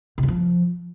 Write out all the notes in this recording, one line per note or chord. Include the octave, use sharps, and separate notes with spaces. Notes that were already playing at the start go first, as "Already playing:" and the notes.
C3
E3
F3